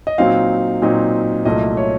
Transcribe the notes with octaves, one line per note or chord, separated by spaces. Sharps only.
D#5
A#2 F#3 C4 D#4 F5
A#2 F#3 C4 D#4
C2 A#2 F#3 A3 D#5
C#5